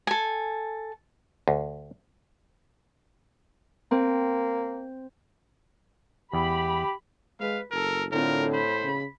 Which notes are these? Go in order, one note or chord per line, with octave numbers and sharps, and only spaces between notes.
A4 G#5
D2
A#3 C4
E2 G4 B5
G#3 B4 F5
F#1 A4 A#4
A2 D3 C4 F4 A#4
C5 B5
C#3